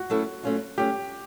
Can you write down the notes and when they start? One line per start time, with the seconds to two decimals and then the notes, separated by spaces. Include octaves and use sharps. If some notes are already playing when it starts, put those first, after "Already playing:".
Already playing: F#4
0.10 F#3 A3 C#4 E4 A4
0.43 F#3 A3 C#4 F4
0.77 F#3 A3 C#4 G4